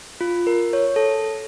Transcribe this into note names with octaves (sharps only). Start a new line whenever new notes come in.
F4
A#4
C#5
A4